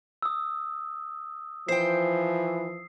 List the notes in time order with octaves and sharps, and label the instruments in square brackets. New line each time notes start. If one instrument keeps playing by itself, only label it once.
[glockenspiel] D#6 E6
[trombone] E3 [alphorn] F3 [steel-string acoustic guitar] C5 G5 [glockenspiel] C7